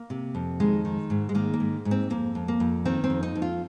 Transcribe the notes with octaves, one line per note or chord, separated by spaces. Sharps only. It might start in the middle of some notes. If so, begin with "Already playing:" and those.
Already playing: A#3
C3
F2
D#3 G#3
D#3
G#2
G#3
D#3 A#3
A#3
G#2
G#2
C4
F2 A#3
F2
A#3
F2
D#3 C4
C4
F2
D#4
F2
F4